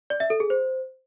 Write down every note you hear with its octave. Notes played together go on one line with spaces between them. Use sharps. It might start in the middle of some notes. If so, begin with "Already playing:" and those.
D5
E5
A4
G#4
C5